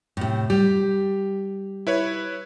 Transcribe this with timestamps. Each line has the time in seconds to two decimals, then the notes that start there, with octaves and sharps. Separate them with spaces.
0.17 A2 C3
0.50 G3 G4
1.87 E4 B4 C#5